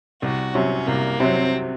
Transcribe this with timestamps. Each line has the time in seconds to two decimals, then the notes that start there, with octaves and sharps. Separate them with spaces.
0.22 C2 F#4
0.54 C3 F#3 C#4
0.87 C2 A#3
1.20 C3 F#3 C4